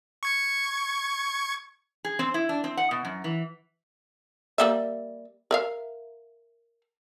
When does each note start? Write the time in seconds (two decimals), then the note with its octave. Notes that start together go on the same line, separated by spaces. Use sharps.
0.23 C#6 G#6 C#7
2.05 G#4
2.19 C4
2.34 E4
2.49 D4
2.64 C4
2.77 F#5
2.91 B2
3.05 F#2
3.24 E3
4.58 G3 A#3 E5
5.51 A#4 E5 F5